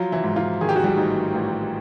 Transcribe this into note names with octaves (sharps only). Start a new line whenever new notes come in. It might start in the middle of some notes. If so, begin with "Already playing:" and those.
Already playing: F3 F#3 F4
E3 E4
G#2
F3 F4
D#3 G#4
G4
F#4
G3 G4
A1 D#4
A1